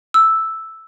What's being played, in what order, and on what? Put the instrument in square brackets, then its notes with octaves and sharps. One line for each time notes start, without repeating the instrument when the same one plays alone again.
[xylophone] E6